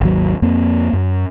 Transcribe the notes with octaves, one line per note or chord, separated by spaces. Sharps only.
G#1 D#2 F#3
F2 A#3 C4
F#2